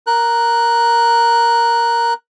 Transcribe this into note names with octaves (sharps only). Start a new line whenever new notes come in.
A#4 F#6